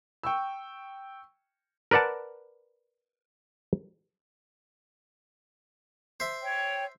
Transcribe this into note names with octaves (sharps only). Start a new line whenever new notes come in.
G5 C#6 E6
A#4 B4 D5 F#5 A5
C5 E5
C#5 G5